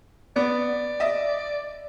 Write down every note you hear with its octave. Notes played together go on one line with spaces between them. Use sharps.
B3 D5
D#5 E5